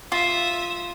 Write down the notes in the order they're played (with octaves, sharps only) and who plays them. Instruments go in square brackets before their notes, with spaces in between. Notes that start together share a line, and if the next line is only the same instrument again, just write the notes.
[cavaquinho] F4 [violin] E5 D#6